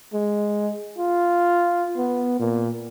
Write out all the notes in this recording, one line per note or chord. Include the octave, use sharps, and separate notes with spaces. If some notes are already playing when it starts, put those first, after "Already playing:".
G#3
F4
B3
A#2